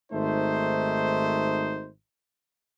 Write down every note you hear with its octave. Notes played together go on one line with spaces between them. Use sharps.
G#1 A3 D#4 C5